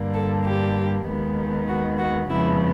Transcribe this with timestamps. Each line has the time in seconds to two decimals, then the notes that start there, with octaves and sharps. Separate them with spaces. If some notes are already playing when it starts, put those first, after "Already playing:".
Already playing: G2 D3 G3 A#3
0.14 A4
0.45 G4
1.07 D#2 D#3 G#3 B3
1.68 F#4
1.99 F#4
2.29 F2 C#3 F3 G#3 B3 E4